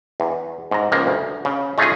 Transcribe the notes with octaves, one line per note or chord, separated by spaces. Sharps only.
E2
G#2 A#5
C#2 C#3 F3 A#3
D2
C#3
G#3 A3 C#4 D#4 F4 G#4